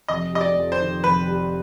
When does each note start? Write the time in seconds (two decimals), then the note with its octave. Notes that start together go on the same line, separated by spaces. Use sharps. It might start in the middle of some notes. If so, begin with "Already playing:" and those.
0.08 F1 D#5
0.33 G3 D#5
0.41 D5
0.57 F2
0.72 C5
0.80 D#3
1.04 F1 B4
1.28 G3